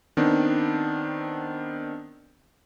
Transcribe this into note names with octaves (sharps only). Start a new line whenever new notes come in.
D#3 B3 C4 D4